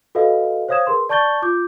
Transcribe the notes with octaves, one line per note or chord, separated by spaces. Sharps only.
F#4 A4 B4 D#5 F5
C5 C#5 F5 D#6 G#6 E7
G#4 A#4 B4 C6
D5 A5 C#6 G6 A6 G7
F4 D6 G6